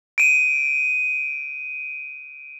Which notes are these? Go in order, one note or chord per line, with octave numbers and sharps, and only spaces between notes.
D7 D#7